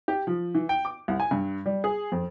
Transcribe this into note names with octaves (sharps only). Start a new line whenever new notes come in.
G4
F3
E3
G5
D6
C2
G#5
G2
G3
G#4
F2